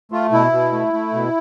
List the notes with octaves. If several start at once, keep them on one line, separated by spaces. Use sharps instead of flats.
A3 F4
B2 E4
B2
A3
A3
B2